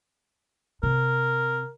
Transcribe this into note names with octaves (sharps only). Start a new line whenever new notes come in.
C3 A#4